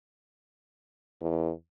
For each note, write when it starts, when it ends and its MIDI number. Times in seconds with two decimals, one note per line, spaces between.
1.21 1.52 40